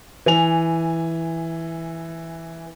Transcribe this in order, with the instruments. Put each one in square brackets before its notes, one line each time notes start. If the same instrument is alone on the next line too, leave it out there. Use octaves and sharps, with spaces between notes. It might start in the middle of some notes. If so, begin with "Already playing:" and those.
[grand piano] E3 G#5 F7